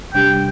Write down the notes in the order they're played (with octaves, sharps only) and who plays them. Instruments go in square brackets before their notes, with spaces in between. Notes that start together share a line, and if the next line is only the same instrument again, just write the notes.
[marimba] C3 G3 D4 G4 [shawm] G5